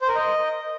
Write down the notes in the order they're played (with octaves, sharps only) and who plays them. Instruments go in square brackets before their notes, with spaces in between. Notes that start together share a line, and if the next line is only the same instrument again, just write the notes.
[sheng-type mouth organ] C5
A#4
D#5